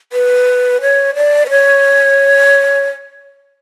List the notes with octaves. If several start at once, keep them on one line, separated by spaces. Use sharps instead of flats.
B4
C#5
D5
B4
C#5